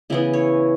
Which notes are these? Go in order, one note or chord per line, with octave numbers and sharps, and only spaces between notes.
C#3 E3 B3 E4
C#5